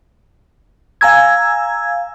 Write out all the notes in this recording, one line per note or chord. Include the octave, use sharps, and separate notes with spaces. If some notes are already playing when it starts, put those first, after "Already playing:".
F5 G#5 A#5 E6 G#6